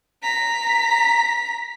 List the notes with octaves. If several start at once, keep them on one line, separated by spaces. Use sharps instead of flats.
A#5 B6